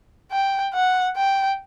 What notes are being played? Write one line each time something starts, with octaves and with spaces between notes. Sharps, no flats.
G5
F#5
G5